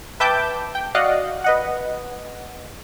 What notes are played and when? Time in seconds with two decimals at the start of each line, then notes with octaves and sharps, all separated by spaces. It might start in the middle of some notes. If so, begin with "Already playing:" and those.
0.20 B4 E5 G5 A5 D6 G6
0.75 G5
0.95 F#4 D5 D#5 F5 F#5
1.44 B4 D#5 F#5